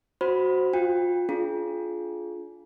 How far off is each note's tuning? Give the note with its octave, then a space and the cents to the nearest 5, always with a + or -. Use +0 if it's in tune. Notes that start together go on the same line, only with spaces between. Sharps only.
F#4 +0 C5 +0 B5 +0
F4 +25 G5 +30
D4 -20 F4 +0 G#4 +35